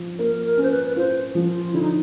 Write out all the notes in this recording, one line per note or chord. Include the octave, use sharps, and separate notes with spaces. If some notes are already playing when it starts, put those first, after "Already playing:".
Already playing: F3
A#3 A#4
A#4
C#4
C5
B4
B4
F4 C5
F3
F4
D3 E4
D#4